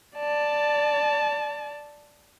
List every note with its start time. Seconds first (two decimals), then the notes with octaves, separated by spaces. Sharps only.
0.17 D5 A5